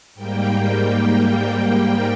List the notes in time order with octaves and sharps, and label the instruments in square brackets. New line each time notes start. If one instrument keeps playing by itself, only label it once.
[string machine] G#2 G3 A#3 G5